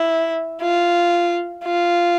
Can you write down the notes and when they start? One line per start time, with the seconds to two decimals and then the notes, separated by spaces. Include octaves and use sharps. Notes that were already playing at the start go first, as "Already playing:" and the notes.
Already playing: E4
0.62 F4
1.65 F4